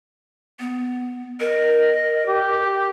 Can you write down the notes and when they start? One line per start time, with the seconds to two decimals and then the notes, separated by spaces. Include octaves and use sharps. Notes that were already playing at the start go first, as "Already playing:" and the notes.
0.60 B3
1.40 A#4 D#5
2.26 G4